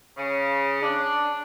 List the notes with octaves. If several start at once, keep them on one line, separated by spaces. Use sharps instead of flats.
C#3
D4